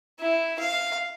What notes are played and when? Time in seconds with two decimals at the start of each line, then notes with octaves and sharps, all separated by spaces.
0.20 E4
0.60 F5